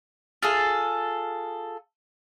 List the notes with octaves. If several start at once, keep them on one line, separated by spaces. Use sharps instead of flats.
F4 G#4 A4